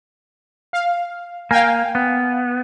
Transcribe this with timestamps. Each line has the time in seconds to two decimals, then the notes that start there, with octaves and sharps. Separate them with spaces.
0.73 F5
1.51 A#3 F5 G5 G#5
1.95 B3